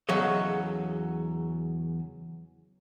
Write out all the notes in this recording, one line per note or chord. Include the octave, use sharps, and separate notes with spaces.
E2 C#3 F#3 A4 C#5 D#5